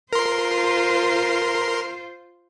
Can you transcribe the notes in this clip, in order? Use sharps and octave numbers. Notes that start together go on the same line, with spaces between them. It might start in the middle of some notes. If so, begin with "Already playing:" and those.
F4 A#4 C5 C6